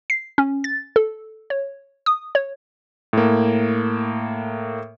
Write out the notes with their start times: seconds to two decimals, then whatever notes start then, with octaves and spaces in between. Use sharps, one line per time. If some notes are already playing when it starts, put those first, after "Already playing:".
0.10 C7
0.38 C#4
0.64 A6
0.96 A4
1.50 C#5
2.06 D#6
2.35 C#5
3.13 A2 A#3